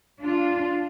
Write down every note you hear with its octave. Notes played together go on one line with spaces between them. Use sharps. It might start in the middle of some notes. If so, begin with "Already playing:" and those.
D4 F4